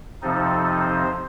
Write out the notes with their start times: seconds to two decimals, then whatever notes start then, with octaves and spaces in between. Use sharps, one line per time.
0.22 F2 C3 F3 C4 D#4 A4
0.81 C5